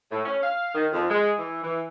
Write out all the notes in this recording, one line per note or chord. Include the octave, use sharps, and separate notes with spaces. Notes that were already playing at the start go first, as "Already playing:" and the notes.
A2
C#4
F5
D#3
F2
G#3
E3
E3